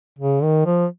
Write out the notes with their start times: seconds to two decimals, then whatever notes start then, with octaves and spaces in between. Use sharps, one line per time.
0.18 C#3
0.43 D#3
0.66 F3